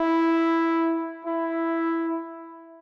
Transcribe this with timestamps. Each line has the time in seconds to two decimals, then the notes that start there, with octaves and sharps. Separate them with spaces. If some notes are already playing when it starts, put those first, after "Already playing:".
Already playing: E4
1.25 E4